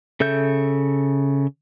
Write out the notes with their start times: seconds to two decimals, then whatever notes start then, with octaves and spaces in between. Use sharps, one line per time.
0.20 C#3 A4 E5 G6